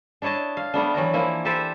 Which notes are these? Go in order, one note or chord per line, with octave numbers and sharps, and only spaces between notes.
D4 E4 C#5 D#5 A5
F5
G3 A3 B3 D4
E3 F#3 D5 A#5
E3 F3 A#3 E4
G4 A4 B4 C5 D5 E5